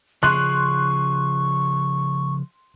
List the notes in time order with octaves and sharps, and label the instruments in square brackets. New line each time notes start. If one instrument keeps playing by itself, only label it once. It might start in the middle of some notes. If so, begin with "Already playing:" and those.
[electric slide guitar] C#3 F3 G#4 [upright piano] C6 F#6 [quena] C#6